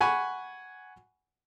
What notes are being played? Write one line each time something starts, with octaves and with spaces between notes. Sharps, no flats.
F#5 G#5 B5 C#6